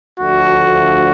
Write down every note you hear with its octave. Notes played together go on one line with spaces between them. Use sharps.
D2 D3 F3 A3 F#4